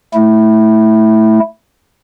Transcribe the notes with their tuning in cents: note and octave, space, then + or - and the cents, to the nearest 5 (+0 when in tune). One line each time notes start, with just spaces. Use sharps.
A3 +0 E4 -10